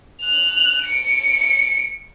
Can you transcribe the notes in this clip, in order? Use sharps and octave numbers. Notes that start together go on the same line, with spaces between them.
F#6 F7
C#7 D7